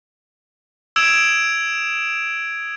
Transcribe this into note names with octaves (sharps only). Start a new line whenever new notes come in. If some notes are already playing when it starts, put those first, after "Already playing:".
D#6 E6 G#6 D7 E7 F7